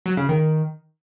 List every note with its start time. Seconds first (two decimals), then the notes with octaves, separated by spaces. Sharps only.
0.06 F#3
0.17 C#3
0.29 D#3